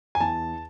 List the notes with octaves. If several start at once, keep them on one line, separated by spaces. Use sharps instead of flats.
G#5
E2 A5